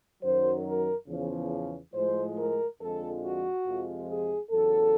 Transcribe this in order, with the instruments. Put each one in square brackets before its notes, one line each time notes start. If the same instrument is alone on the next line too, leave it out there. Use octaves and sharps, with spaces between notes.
[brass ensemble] F#2 D#3 F#3 C5
A#4
E2 C#3 F3
A2 F3 G#3 C5
A#4
F2 D3 F3 G#3 A4
F#4
F2 C3 F3 G#3
G#4
E2 C#3 F#3 A4